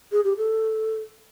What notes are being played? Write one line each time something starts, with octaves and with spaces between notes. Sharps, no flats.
G#4
G4
A4